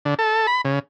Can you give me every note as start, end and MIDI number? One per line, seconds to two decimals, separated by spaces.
0.05 0.14 50
0.19 0.47 69
0.47 0.61 83
0.65 0.79 49